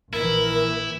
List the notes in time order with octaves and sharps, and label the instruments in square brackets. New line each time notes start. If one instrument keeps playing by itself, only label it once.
[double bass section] A#1 E3 [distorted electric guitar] E4 [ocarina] A#4